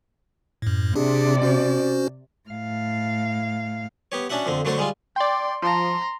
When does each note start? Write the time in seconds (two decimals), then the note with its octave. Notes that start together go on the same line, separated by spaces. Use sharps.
0.62 F#2 A2
0.95 C3 D4 G4 G#4 D5
1.42 C#4 F#4 C5
2.49 A2 F5
4.12 B3 G4 C#5
4.30 C#4 D4 F#4 E5 F#5
4.46 F2 D3 C4
4.65 D3 F#3 A3 F#4 A4 C5
4.78 G3 G#3 F4
5.16 D5 G5 C6
5.62 F3 A#5 C6